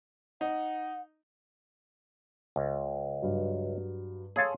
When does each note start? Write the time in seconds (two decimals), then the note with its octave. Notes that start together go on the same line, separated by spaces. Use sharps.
0.41 D#4 F#5
2.56 C#2
3.22 G2 F#3
4.36 G#4 A4 C#5 F5 C6